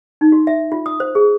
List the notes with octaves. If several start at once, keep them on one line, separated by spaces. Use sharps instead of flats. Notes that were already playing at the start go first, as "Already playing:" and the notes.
D#4
F#4
E5
F4
D#6
C5
G#4